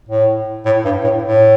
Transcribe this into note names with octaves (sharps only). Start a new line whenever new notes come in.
A2
A2
G2
A2
A2